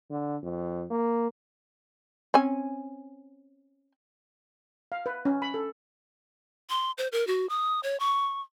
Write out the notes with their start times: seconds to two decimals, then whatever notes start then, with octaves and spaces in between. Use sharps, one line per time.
0.10 D3
0.42 F2
0.90 A#3
2.34 C4 C#4 G#5
4.92 F5
5.06 B4
5.25 C#4
5.42 B5
5.54 A4
6.70 C6
6.98 C5
7.12 A#4
7.27 F#4
7.49 D#6
7.83 C#5
8.00 C#6